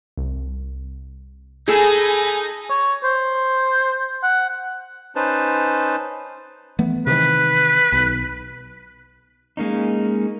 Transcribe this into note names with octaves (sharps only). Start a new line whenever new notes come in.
C2
D#4 G#4 A4 G#5 B5
C#5
C5
F#5
C#4 D#4 B4 C5 A5
E3 A3 B3
C3 D#3 E3 B4
B1
G#3 A#3 C#4 D#4